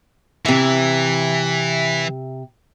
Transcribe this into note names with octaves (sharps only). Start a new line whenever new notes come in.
C3 E3 E5